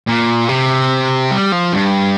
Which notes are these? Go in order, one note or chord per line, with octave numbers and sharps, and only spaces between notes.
A#2
C3
G3
F3
G2